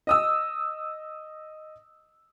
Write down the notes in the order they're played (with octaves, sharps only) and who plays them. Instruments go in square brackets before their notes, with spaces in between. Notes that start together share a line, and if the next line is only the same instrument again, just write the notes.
[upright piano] D#5 D#6 E6